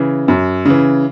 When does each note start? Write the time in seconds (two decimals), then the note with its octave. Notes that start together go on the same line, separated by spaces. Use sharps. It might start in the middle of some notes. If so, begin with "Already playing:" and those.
Already playing: C#3 E3
0.28 F#2
0.65 C#3 E3